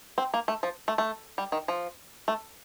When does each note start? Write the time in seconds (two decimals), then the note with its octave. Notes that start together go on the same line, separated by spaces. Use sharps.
0.18 C4
0.34 A#3
0.48 A3
0.63 F3
0.88 A3
0.98 A3
1.38 G3
1.52 D#3
1.68 F3
2.28 A3